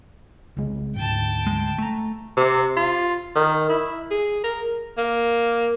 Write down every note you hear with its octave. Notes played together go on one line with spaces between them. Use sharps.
C2 C#3 G#3
D2 G#2 G5 A5
G#3
A3 A#5
C3
F4
D#3
E4
G#4
A#4
A#3